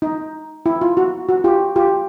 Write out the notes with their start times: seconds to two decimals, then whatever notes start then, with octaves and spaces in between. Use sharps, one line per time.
0.02 D#4
0.66 E4
0.81 F4
0.97 F#4
1.29 F#4
1.44 F4 G4
1.76 F4 G4